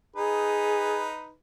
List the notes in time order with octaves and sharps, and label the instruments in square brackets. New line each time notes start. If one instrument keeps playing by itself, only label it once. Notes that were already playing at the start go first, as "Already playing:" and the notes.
[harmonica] D#4 B4 [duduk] G#4